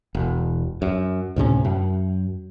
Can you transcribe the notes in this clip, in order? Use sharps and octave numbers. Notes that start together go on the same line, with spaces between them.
E1
F#2
D2 A2 C3 C#4
F#2